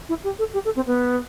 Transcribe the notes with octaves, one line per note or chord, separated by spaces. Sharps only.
E4
G4
A4
G4
A4
C4
B3